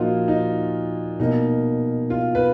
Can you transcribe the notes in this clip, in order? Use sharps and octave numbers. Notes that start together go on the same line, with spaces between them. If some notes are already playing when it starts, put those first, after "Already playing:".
Already playing: A#2 F3 A#3 D#4 F4 F#4
D#4
B2 A#3 D#4
F4
B4